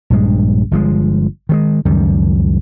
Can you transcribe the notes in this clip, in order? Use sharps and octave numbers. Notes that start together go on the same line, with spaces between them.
A#1 G2 G#3
G1 F3 G#3
D#3 F#3 G#3
C#2 F#2 D#3 G3